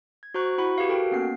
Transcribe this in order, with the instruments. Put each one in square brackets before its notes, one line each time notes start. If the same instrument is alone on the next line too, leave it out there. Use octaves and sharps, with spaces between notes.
[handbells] G#6
F#4 C5 A#5 C#6 F#6
E4 F#4 F#5 B5 C#6
F#4 G4 B4 F5
F#4 A4 A#4 G5
A#3 B3 C#4 C7